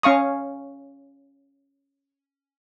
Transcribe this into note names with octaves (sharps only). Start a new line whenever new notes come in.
C#4 F5 C#6 D#6